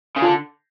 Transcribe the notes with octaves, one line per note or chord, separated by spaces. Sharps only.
C#3
D3 F4